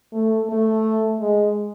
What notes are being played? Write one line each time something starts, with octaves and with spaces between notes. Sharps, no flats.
A3
A3
G#3